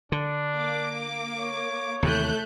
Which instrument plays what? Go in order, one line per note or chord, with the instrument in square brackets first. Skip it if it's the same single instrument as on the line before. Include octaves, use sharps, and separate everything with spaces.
[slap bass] D3 [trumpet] D4
[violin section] A#3 D6
[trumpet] C#5
[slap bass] D#2 C3 E3 [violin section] A3 F#6 G6